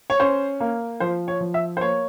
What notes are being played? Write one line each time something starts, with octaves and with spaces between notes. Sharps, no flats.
C#5
C#4 C5
A#3
F3 C5
C#5
F3
E5
C5
A#3 C#5